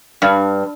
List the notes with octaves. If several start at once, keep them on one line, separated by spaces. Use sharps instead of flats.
G2